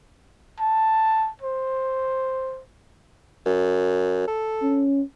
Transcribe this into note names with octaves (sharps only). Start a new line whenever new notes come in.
A5
C5
F#2
A4
C#4